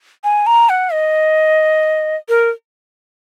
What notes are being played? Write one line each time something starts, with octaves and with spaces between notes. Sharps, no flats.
G#5
A#5
F#5
D#5
A#4